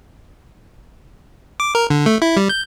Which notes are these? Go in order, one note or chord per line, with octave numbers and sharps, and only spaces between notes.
D6
A#4
D3
A3
E4
G3
G6